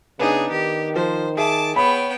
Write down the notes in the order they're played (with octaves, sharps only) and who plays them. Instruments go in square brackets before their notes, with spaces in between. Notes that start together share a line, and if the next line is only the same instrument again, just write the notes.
[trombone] C#3 [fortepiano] B3 D4 D#4 [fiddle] G#4
[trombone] D#3 [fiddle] G4
[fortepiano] F3 [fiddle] C5
[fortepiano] G#4 E5 [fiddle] A5 D6
[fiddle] B3 G5 [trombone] C#5 [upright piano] B5